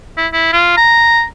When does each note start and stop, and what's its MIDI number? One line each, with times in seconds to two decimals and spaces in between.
0.17 0.27 64
0.33 0.50 64
0.53 0.77 65
0.77 1.23 82